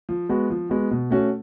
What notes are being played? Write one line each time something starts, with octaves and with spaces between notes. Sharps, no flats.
F3
G#3 B3 F#4
F3
G#3 B3 F#4
B2
A3 C#4 F#4